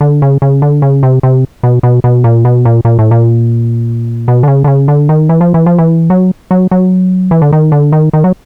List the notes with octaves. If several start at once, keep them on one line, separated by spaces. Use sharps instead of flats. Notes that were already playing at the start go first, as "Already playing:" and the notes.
D3
C#3
C#3
D3
C#3
C3
C3
B2
B2
B2
A#2
B2
A#2
A#2
A2
A#2
B2
D3
C#3
D3
C#3
D3
D#3
E3
F3
E3
F3
E3
F#3
F#3
F#3
E3
D3
D#3
D3
D#3
D#3
F#3